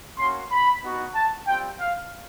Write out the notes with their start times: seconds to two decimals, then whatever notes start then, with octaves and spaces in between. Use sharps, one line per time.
0.17 A#3 C#4 F#4 C6
0.51 B5
0.82 B3 D#4 F#4
1.14 A5
1.47 G3 C4 F4 G5
1.80 F5